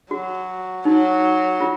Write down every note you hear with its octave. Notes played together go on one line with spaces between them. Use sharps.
F#3 F#4
F#3 D#4
F4